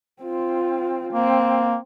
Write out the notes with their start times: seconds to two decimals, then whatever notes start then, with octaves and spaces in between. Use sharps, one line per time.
0.23 C4 F4
1.13 A#3 C4